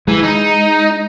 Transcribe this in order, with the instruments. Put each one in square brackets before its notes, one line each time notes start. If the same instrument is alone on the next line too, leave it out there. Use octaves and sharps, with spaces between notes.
[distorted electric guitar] E3 [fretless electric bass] G#3
[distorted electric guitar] D#4